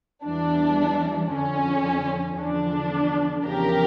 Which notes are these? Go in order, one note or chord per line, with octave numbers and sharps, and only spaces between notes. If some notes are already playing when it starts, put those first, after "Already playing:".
E2 E3 G3 D4
F2 D3 F3 C#4
E2 D3 F3 D4
E2 C#3 F3 G4 A#4